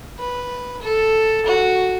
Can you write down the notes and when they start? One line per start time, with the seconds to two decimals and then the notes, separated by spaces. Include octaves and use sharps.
0.19 B4
0.82 A4
1.46 F#4